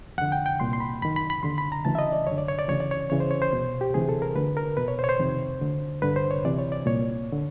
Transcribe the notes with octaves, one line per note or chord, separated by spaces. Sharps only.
F2 D3 F#5
G5
G5
C2 A#2 C6
C6
B5
F#2 D#3 B5
B5
B5
D#2 D3 C6
B5
A#5
D2 C#3 E3 A5
E5
D#5
D5
F#2 D3 C#5
D5
C#5
D5
D2 C#3 E3 C#5
D5
C#5
E2 C#3 E3 C#5
C5
C#5
C5
C2 B2
G4
D2 C3 E3 G#4
A4
A#4
D2 D3 B4
A#4
E2 B2 B4
C#5
C5
C#5
C5
F2 C3 D#3
D2 D3
G2 D3 B4
C5
C#5
D2 C3 E3 D5
C#5
D5
C2 A#2 C#5
D3